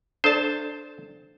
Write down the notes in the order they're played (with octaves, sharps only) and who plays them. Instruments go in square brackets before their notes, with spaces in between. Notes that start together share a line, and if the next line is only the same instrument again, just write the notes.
[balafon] D4 A4 D5 [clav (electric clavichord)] C5 A5